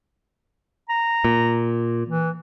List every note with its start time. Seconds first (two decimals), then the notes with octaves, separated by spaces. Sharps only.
0.89 A#5
1.24 A#2
2.09 E3